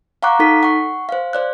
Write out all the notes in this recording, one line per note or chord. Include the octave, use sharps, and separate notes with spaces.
F5 F#5 A#5 C#6 D6 F#6
D#4 A4 B6
F#5 C#6
C5 F5
C5 D5 F#6